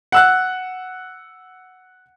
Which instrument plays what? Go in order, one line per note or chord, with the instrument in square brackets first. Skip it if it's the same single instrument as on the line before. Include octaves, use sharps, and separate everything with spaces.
[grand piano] F#5 E6 F#6